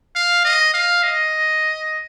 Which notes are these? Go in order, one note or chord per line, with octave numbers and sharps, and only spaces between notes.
F5
D#5
F5
D#5